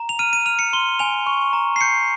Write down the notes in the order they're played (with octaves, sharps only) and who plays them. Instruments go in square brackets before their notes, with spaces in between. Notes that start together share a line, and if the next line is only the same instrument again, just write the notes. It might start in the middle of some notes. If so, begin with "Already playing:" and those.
Already playing: [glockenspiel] A#5
F7
F6 D#7
D#7
F6 F7
C#7
C6 G7
G#5 F7
C#6
A#5
C7
G6 C#7